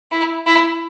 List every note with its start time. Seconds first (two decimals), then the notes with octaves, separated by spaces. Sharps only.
0.12 E4
0.46 E4